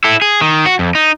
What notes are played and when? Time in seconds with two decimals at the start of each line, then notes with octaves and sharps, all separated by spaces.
0.04 E4 A4
0.22 G#4
0.41 D#3
0.66 F#4
0.79 F2
0.95 D#4